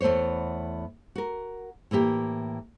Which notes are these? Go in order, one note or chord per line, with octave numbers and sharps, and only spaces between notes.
E2 A3 B3 C5 C#5
F#4 A#4
A2 E3 A#3 G4